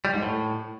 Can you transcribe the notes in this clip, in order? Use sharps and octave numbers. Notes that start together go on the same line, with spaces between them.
G3
G#2
A2